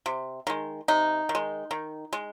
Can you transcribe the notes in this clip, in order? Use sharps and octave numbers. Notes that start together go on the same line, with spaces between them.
C3
D#3 G#3
C3 D#4
D#3
G#3
D#3
G#3